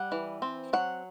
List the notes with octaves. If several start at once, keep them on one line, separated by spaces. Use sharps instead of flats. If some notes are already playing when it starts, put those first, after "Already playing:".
Already playing: G3 F#5
E3
C4
F#3 F#5